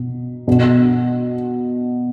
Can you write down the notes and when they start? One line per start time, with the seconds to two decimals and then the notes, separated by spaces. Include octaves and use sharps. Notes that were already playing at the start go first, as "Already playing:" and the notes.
Already playing: B2
0.48 B2